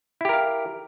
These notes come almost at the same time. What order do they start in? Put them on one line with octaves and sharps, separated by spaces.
E4 G4 A#4 F5